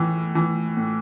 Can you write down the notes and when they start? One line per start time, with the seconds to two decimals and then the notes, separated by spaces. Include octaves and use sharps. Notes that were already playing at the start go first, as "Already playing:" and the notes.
Already playing: A2 E3
0.35 E3
0.77 A2